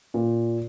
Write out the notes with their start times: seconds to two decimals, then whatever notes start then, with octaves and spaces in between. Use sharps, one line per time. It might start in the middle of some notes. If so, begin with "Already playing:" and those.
0.14 A#2